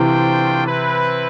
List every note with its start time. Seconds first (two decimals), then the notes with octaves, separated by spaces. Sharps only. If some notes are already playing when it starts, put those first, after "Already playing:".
Already playing: C3 E3 A3 D4 F4 C5 G5
0.66 C4 E4 B4